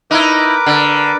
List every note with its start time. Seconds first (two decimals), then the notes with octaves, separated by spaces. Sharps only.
0.11 D#4 E4 A#4 B4 D6
0.66 D3